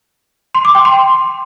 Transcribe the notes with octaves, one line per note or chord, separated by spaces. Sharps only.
C6
D6
G5
C6